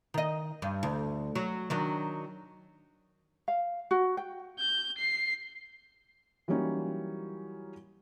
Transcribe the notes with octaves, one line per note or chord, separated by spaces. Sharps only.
D#3 D#5
G2
D2
F#3
D#3 F#3 D4
F5
F#4
G5
G6
C7
E3 F#3 G3 A#3 C#4 D#4